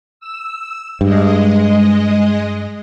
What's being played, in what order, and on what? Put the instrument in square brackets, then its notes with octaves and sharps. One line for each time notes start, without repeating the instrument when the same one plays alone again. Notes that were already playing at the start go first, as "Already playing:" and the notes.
[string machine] E6
[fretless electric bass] G2 [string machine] G#3 D#5